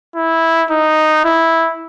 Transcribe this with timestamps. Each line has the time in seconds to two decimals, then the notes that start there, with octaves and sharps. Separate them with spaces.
0.15 E4
0.71 D#4
1.25 E4